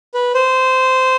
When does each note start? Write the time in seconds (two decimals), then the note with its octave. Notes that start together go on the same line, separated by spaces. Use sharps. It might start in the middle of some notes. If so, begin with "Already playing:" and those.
0.14 B4
0.34 C5